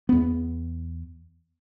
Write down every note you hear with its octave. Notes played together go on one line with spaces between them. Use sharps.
E2 B3